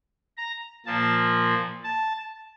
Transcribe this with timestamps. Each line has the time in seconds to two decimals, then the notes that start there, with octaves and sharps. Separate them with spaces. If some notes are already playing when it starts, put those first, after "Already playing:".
0.38 A#5
0.86 A#2 F3 A#3 A5
1.84 A5